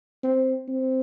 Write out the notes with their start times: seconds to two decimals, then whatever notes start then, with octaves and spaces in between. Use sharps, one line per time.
0.23 C4
0.68 C4